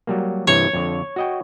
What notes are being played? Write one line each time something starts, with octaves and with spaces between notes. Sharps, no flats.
F#3 G3 A#3
G2 C3 E3 C#5
F2 D3
F#4 D#5 G5